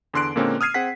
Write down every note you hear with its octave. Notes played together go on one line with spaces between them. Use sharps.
E2 D3 C6 F#6 D7
A#2 D3 G#3 A#3 C4 C#4
D#6 F6 G#6 C7 D#7
C4 G#4 F#5 B6